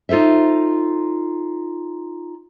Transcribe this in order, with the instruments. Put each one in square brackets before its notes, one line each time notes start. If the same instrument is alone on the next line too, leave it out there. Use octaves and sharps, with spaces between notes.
[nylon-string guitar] D#4 F4 A4 C5 E5